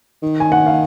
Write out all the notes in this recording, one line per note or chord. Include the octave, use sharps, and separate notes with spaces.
D#3
G#5
F#5
F5